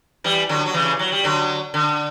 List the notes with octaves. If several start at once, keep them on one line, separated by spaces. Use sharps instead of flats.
E3 G3
D3 F#3
F#3
C#3 E3
F#3
G3
D3 F#3
D3